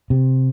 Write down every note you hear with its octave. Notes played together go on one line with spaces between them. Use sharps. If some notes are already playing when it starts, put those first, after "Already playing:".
C3